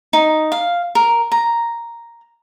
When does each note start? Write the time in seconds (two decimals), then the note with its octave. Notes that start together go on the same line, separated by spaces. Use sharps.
0.13 D#4
0.52 F5
0.95 A#4
1.32 A#5